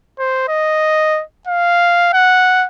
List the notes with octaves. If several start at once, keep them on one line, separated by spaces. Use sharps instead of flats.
C5
D#5
F5
F#5